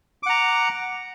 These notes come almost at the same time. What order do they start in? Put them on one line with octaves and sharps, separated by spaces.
D6 F#5 A#5